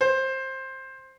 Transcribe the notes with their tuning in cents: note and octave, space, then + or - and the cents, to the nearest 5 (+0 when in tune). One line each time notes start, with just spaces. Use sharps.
C5 +15